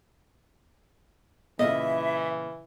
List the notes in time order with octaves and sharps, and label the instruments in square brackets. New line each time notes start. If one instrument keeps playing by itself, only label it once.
[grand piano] A#2 C#3 F4 [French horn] E3 [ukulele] D#5 [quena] E5